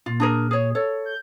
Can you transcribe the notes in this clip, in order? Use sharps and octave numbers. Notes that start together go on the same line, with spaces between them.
A#2 F4
D4 G#4 A#4
G#4 C#5
A4 C#5
G6